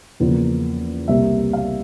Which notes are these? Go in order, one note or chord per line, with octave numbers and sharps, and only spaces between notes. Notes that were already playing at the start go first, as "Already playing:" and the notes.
E2 C#3 F3 A#3
C2 C3 G3 A#3 E5
F5